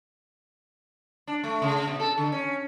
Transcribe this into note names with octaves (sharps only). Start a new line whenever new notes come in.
D4
A3
C#3
B2
A4
D3
C#4